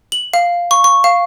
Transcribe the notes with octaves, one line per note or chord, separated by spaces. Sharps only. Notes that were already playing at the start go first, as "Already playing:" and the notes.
F#7
F5
C#6
C#6
F5